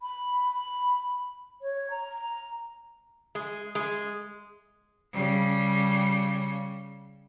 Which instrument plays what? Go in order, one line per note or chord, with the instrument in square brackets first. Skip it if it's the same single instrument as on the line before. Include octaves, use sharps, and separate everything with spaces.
[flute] B5
C#5
A#5
[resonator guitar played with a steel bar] G#3
G#3
[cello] C#3 G3